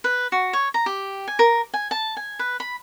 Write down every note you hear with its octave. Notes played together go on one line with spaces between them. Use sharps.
B4
F#4
C#5
A#5
G4
G#5
A#4
G#5
A5
G#5
B4
B5